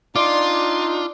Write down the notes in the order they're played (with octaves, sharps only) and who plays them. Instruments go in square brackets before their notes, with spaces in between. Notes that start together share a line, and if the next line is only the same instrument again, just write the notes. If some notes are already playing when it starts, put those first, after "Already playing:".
[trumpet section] D4 D#4 [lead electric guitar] F4 [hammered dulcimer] D5 [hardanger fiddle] C6